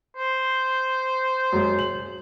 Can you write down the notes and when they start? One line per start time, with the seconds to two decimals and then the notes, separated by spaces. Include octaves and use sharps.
0.17 C5
1.53 F#2 G#3
1.79 F#7